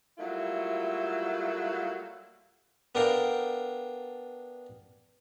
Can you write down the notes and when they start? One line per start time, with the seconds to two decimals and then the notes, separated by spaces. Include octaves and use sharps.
0.18 F#3 G3 A3 A#3 E4 F4
2.95 B3 D4 A4 A#4 F5 G5